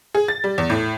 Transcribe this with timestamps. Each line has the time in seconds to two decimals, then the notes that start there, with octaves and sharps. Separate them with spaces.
0.15 G#4
0.28 A6
0.44 G3
0.58 E2
0.70 A2